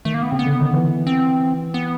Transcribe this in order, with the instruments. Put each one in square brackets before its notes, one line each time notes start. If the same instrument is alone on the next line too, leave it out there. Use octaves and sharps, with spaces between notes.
[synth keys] D#3 [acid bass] A3
[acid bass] A#3
B3
[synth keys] C#3 [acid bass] C4
[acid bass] B3
[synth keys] D3
D#3
E3
[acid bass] C4
B3